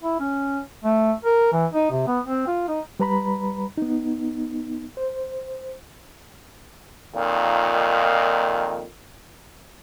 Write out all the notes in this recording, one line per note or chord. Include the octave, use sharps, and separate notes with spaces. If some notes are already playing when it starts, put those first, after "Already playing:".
E4
C#4
A3
A#4
E3
D#4
C3
B3
C4
F4
D#4
G3 B4 A#5 B5
B3 D#4
C5
F2 A#2 D#3